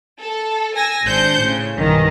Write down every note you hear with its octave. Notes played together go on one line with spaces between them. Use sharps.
A4
G#5 E6 G#6 A#6
G#1 D4 C5 G6 C#7
A2 C#3
B1 G2 D#3 E3